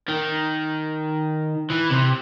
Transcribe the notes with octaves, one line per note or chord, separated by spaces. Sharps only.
D#3
E3
C3